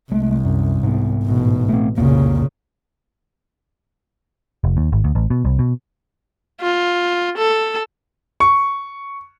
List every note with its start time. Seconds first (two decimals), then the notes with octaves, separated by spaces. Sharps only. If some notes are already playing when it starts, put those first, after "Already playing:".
0.11 C2 G#3 A3
0.44 F#2
0.83 G#2 B3
1.24 A1 B2
1.69 A3 C4
1.98 C2 F2 A#2 C#3 A#3
4.64 F1
4.77 D#2
4.92 G#1
5.04 D2
5.15 A1
5.30 B2
5.45 C2
5.59 B2
6.61 F4
7.37 A4
8.40 C#6